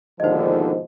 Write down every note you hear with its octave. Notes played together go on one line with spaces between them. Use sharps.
D#2 G#2 B2 D3 F3 C5 D#5